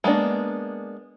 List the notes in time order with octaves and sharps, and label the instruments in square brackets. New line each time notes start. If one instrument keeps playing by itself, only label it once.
[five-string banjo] G#3 A#3 B3 D4